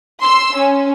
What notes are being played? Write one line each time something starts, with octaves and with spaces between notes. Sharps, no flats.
C6 E6
C#4